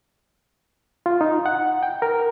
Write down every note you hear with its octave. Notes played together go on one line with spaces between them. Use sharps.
F4
D#4
F#5
G5
A#4